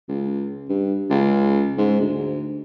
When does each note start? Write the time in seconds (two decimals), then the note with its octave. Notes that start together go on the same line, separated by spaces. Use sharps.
0.08 C#2
0.69 G2
1.10 C#2
1.78 G#2
2.01 D2